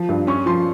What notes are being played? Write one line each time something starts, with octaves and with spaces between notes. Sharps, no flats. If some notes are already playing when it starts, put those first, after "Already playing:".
Already playing: F3
G2
C#4 C#6
F3 C6